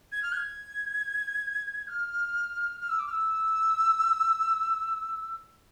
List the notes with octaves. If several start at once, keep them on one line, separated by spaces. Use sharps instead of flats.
G#6
F6
G#6
F6
F6
E6
D6
F6
E6